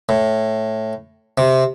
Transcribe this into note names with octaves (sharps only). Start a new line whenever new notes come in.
A2
C3